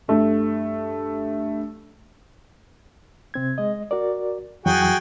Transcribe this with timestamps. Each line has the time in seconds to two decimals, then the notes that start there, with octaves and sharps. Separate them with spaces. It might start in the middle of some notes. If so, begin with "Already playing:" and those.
0.08 G2 A3
3.34 C3 C4 G#6
3.58 G#3 D#5
3.91 F#4 A#4 D5
4.66 F2 E3 F#3 F#4 G#4 G5